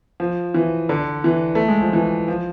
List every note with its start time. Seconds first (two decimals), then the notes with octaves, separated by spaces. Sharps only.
0.20 F3
0.54 E3
0.89 D3
1.24 E3
1.55 A3
1.68 G#3
1.81 F3
1.93 E3
2.28 F3